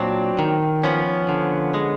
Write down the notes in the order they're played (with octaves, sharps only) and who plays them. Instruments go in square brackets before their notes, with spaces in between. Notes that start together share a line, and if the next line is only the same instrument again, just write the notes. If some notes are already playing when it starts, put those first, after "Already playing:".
Already playing: [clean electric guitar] A#2 F#3 C4 D4
D#3
F3 B3 C#4
D3
G#3